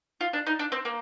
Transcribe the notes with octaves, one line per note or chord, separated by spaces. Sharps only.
F4
D4
D#4
D4
C4
A#3